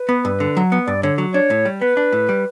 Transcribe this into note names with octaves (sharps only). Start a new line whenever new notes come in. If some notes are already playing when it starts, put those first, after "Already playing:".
Already playing: B4
B3
G2
D3
F#3
B3
G2 D5
D3 C#5
F#3
D4 C#5
A2
G3
B3 B4
D4
A2
G3